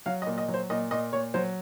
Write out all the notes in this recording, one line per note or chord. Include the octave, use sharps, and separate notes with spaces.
F#3 F5
D#5
A#2
D#5
F#3
C5
A#2 D#5
A#2 D#5
A#2 C#5
F#3 C5